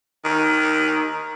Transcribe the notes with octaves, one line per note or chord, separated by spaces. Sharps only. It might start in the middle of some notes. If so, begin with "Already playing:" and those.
D#3